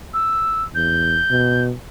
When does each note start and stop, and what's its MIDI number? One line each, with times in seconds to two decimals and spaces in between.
0.14 0.63 88
0.75 1.20 40
0.75 1.64 91
1.31 1.73 47